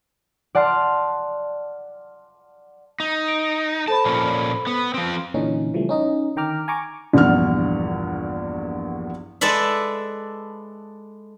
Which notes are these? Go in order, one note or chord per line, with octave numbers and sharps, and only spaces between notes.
D5 F#5 A5 C6 F6
D#4
D7
A4 C5 A5 B5
A#2 F3 C#4
B3
F3 C4
A#2 D3 E3 C#4 D#4
C#3 E3 F3 G3 A3
C#4 D#4 D#5
D3 D#3 G5 A#5 D6 F6
G#5 A#5 C#6 D6
A#1 E2 G2 F#5 F6
G#3 A4 B4 D5 E5